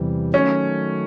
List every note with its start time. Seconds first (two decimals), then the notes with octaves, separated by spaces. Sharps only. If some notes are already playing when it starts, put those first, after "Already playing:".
Already playing: E2 C3 E3 G3
0.34 D#3 F#3 A3 C#4